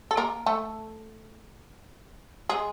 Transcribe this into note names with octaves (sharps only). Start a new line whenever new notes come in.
A4
A#3 A#4
A3 A4
G#3 G#4